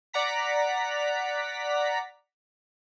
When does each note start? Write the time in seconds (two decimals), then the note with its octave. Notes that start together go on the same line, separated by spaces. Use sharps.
0.14 D5 F#5 A#5 B6